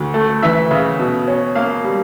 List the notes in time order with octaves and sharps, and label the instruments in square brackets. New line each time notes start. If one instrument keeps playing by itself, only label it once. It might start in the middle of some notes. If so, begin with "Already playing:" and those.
Already playing: [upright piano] D2
A3
E3 E5
C#3
B2
C#4
A#3 F5
G3